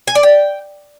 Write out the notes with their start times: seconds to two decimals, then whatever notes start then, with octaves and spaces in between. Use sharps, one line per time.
0.07 G#5
0.15 D5
0.23 G5